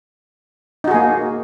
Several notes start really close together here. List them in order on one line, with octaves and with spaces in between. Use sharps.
D#4 F#4 G#4 A#3